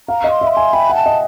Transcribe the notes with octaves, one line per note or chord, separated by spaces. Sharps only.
F5 A#5
D#5
C6
E5
B5
G#5 C6
G5 B5
F#5
A5
D#5